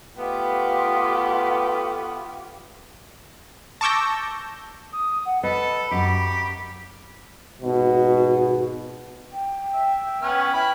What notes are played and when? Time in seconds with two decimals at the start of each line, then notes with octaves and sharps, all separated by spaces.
0.17 A3 B3 F4 G4
3.81 A5 C#6 D6 E6 G6 A#6
4.93 D#6
5.25 F#5
5.43 A4 B4 D#5 B5
5.91 F#2 G4
7.62 G#1 B2
9.33 G5
9.74 E5
10.22 B3 C#4 F6
10.54 E4 G5 B5